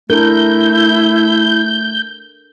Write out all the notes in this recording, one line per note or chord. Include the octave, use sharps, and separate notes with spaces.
A3 D4 E4 A4 A#4 G6